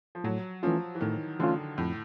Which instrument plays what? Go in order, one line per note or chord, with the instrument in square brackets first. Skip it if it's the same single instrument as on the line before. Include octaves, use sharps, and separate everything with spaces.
[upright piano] F3
[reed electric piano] A2 [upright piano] F#3
[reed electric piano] E3 A3 C#4 F4 [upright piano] F3
[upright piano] E3
[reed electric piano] A2 [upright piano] D#3
[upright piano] D3 [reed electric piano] E3 A3 C#4 F4
[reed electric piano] F2 [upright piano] A2